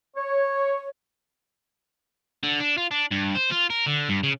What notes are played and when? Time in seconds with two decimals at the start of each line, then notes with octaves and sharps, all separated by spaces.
0.16 C#5
2.44 D3
2.60 D4
2.78 F4
2.91 D4
3.12 G2
3.35 C5
3.52 F4
3.70 A#4
3.86 D3
4.09 G2
4.23 C#3